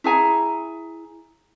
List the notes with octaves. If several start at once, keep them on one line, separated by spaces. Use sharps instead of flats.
E4 G#4 G#5 A#5